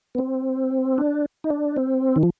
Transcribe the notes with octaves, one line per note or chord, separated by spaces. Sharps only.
B3
C4
D4
D#4
D4
C4
D#3
F3